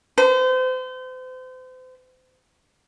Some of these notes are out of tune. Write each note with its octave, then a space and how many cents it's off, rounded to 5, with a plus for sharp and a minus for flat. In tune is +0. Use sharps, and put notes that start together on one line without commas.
C5 -35